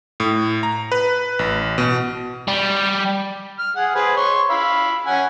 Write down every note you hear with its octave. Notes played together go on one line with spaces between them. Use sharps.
A2
A#5
B4
A1
B2
G3
F6
G#4 F#5
G#4 B4 C5
C#5 C6 C#6
F5 B5 E6
C#4 F#5 G#5